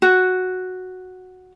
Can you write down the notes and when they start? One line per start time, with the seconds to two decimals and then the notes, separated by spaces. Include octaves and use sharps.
0.02 F#4